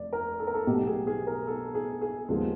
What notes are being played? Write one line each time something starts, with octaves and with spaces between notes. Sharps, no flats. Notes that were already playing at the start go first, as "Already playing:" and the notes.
Already playing: F1 D5
A#4
A4
A#4
A4
B1 B2 F#3 A3 G4
G#4
G#4
A#4
A4
G#4
G#4
D#2 C#3 F3 G#3 B3 G#4